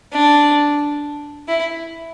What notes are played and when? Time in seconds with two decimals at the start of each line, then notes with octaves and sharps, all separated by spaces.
0.12 D4
1.48 E4